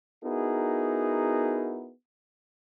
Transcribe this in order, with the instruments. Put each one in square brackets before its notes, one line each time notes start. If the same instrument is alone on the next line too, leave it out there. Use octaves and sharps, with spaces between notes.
[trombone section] B3 D#4 E4 F#4 G#4 A#4